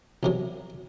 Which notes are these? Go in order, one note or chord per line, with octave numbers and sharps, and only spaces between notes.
B1 C3 F#3